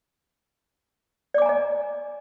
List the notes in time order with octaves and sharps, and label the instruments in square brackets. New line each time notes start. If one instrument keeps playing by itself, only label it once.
[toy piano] D5
D6
G#5
A#5
D#5